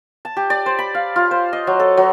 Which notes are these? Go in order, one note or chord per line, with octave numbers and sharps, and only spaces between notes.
A5
G4
D5
C5
B5
F5
F4
C5
D#5
F#3
A4
F#3